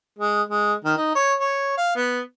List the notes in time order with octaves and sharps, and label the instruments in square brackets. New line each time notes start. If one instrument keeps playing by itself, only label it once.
[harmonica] G#3
G#3
D#3
D#4
C#5
C#5
F5
B3